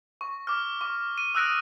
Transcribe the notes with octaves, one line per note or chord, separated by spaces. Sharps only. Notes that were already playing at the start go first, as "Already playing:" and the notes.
C#6
D6 F6
C#6 D6
D#7
D#6 E6 F#6 A#6 D7